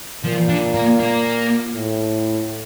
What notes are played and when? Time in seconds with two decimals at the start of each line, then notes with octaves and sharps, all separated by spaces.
0.24 A#2 F3
0.49 D3
0.74 A#3
1.00 A#3
1.75 A2